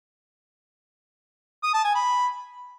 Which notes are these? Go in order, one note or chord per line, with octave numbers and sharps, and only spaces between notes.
D#6
A5
G#5
B5